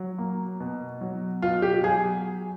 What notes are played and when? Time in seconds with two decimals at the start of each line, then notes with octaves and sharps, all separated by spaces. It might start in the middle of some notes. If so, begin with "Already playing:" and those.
Already playing: F#3
0.18 A#3
0.60 B2
1.01 F#3
1.42 B2 F4
1.62 G4
1.83 F#3 G#4